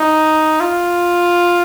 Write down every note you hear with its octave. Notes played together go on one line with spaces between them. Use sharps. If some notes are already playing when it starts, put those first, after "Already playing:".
Already playing: D#4
F4